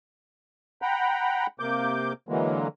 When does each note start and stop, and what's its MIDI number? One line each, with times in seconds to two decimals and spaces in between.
0.82 1.47 78
0.82 1.47 79
0.82 1.47 82
0.82 1.47 83
1.60 2.13 48
1.60 2.13 58
1.60 2.13 86
1.60 2.13 91
2.29 2.68 50
2.29 2.68 52
2.29 2.68 54
2.29 2.68 56
2.29 2.68 58